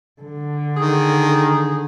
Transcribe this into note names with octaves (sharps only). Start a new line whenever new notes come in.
D3
D#3 G#4